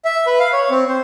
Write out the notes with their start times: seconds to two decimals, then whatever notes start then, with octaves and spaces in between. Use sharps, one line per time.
0.05 E5
0.27 B4
0.40 F5
0.53 C#5
0.70 C4
0.89 C5